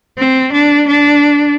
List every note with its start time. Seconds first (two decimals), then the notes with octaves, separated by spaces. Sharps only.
0.18 C4
0.52 D4
0.87 D4